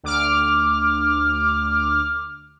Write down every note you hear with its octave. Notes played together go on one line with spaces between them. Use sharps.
D2 D6 F6